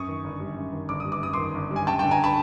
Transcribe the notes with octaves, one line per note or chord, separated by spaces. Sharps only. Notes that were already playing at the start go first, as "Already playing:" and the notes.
Already playing: F#2 C#6 D#6
D#3
G1
G3
F#2
D#3
G1 D6
G3 D#6
D6
F#2 D#6
D#3 C6 D6
G1
G3
G#5
F#2 G5 A5
G5 A5
D3
G#5 A#5
A5 B5